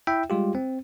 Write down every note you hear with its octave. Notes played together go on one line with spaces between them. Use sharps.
E4 E5 G5
G3 G#3 F4 G4
C4